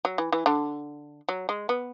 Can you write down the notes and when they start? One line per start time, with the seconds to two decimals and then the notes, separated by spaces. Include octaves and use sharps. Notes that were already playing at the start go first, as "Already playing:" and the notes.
0.05 F#3
0.18 E3
0.32 E3
0.46 D3
1.29 F#3
1.49 G#3
1.69 B3